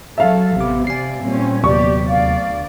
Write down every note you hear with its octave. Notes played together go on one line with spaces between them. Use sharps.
F#3 A4 E5 F5
A1 C3 B3 D6
C3 D5 G#5 C7
A#2 G3 C4 C#4
D#2 C3 F#3 B3 G4 D5 C#6
D2 D5 F5